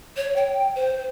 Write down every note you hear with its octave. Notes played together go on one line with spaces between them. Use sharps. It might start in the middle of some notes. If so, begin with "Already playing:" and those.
C#5
G5
C5